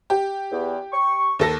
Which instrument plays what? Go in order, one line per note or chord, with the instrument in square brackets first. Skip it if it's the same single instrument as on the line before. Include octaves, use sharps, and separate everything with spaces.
[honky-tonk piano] G4
[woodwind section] E2
C#6
[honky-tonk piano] D#2 A4 A#6